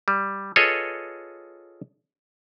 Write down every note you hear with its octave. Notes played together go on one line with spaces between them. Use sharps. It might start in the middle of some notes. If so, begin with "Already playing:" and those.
G3
F4 G#4 A4 B4 C#5 D#5